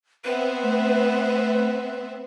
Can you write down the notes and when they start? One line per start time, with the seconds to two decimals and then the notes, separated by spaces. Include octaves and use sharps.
0.25 B3 C4 B4 E5
0.63 A3